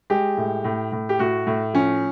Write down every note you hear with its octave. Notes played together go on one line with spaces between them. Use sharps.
G#3 G4
A2
A2
A2
G4
A2 F#4
A2
F3 C#4